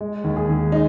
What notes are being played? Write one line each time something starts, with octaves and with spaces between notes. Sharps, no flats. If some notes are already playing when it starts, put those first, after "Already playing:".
G#3
D#2
G#4
D#2
G#3 D#4